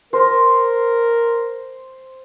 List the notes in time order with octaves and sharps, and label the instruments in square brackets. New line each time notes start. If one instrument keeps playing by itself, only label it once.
[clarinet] A#4 [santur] C5